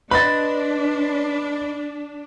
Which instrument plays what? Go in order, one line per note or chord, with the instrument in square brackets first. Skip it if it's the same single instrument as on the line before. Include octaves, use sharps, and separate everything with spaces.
[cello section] D4 [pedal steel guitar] B4 D#5 C6 [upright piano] B5 A6